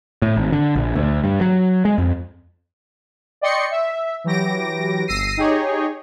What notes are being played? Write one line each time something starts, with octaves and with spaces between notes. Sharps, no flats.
A2
G#1
D3
A#1
D2
G2
F#3
G#3
F2
D5 D#5 G5 C6 C#6 C#7
E5
E3 F#3 G4 A#6 D7
G1 E6 A#6 C7 D#7
D#4 G4 G#4 C#5 D#5